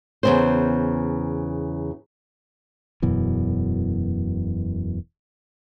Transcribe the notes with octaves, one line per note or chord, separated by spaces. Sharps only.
E2 C#3 C5
E1 F#2 B2 E3